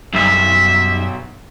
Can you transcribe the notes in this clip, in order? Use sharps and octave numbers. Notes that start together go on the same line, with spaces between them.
B1 F#2 G3 D#4 E5